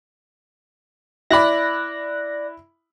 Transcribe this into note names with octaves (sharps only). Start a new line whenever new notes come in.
E4 D5 B5 F#6 A#6